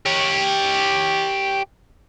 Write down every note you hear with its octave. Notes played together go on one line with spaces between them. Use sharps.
G4 C#5